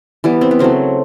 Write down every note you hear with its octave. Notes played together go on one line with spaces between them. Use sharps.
E3 G3 B3
C4
B3
C#3 F#3 A3 C4